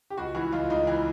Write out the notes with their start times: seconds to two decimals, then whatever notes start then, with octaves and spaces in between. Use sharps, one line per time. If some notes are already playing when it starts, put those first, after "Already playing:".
0.10 G4
0.17 C#2 F#4
0.35 E3 F#4
0.52 C#2 F4
0.70 C#2 D#4
0.87 E3